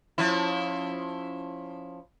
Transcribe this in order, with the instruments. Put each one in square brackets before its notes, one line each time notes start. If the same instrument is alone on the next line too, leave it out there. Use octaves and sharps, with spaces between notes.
[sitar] F3 C#4 E4